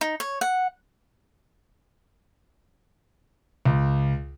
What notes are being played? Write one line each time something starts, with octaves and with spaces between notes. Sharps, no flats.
D#4
C#5
F#5
C#2